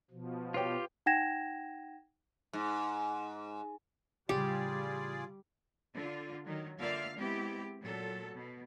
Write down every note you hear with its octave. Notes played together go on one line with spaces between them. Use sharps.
B2 F3
F4 G4 B4 C#5 G5
D#4 F#5 G5 G#6 A#6 E7
G#2
A1 C#3 G3 F4 G4 G#4 D5
D3 F4
D#3 F#3
D3 A#3 F4 D5 E5 F5
G#3 B3 C4 E4 G4
A#2 F#3 A4
B2